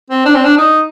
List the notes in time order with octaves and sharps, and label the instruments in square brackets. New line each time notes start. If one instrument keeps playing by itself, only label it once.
[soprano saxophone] C4
D4
C4
D4
D#4